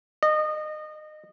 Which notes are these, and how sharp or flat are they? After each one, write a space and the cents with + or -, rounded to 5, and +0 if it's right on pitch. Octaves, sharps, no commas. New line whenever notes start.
D#5 -25